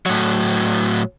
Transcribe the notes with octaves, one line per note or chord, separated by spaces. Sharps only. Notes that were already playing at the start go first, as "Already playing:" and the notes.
A2 F#3